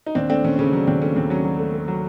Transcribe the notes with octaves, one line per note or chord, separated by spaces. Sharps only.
D#4
D#2 C4 D4
A3 C4 D4
D#2 C#4
C#3 C#4
F#3 C#4
D#2 C4 D4
A3 C#4
D#2 C4
F#3 C#4
F#3
A3
A3
F#3